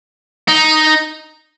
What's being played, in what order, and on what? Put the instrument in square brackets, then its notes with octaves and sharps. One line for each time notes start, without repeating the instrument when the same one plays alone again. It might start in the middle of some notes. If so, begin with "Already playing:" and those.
[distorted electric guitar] D#4